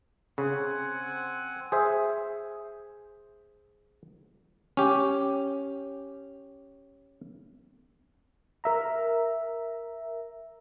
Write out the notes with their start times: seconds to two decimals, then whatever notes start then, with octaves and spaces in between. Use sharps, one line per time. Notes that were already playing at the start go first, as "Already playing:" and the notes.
0.38 C#3 C4 F#5 G#5
1.72 G#4 C5 E5
4.77 C#4 G4
8.64 A#4 E5 A#5